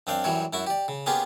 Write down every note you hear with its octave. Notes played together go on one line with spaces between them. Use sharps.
F#2 C4 D4 F5 G5
F#2 E3 F#3 G3 C#5
F#2 E4 F#4 C#6
G4 D5
C#3
A#3 B3 C#4 F4 G4 G#4